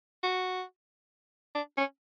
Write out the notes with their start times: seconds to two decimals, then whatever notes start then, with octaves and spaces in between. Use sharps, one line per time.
0.23 F#4
1.55 D4
1.78 C#4